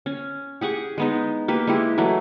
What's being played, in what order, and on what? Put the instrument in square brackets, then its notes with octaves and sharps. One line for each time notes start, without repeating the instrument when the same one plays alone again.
[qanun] C#4
G4 G#4 F#5 C#6
G#3 B3 D#4
A#3 G4 B4
G#3 E4 G4
E3 F#3 A3